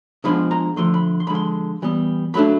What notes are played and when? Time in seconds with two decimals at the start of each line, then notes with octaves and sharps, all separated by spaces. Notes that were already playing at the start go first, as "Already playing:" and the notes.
0.24 C#3 F3 G#3 B3 D4 B5
0.51 A#5
0.76 D3 F3 A3 C6
0.94 B5
1.20 C6
1.27 D3 F3 G#3 B5
1.35 C6
1.82 E3 G3 B3
2.34 F#3 A3 D4 B5